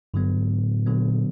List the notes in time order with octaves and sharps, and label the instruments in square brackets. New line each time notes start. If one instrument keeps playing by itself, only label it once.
[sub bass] G2 [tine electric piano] D3 F#3 B3
[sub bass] G#2
A2
[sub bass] A#2 [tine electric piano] D3 F#3 B3